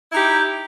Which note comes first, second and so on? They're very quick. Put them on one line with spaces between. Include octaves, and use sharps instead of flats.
E4 D#4 G4